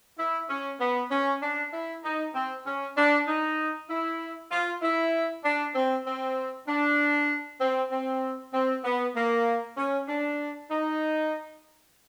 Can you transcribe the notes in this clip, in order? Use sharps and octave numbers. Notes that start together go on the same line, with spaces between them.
E4
C#4
B3
C#4
D4
E4
D#4
C4
C#4
D4
D#4
E4
F4
E4
D4
C4
C4
D4
C4
C4
C4
B3
A#3
C#4
D4
D#4